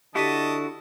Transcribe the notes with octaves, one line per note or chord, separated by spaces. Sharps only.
D3 E4 F#4 G4 D#5 A5 B6 D#7